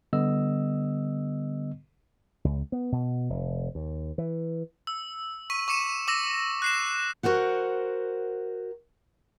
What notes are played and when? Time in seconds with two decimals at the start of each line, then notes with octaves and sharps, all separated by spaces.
0.13 D3 G3 B3 D#5 E6
2.45 C#2
2.72 B3
2.92 B2
3.30 F1
3.75 D#2
4.18 E3
4.87 E6
5.50 C#6 B6 D#7
5.68 C#6 D6 C#7 D#7 E7
6.08 D6 E6 A#6
6.62 F#6 C7 E7
7.23 F#4 A#4 C5 F#5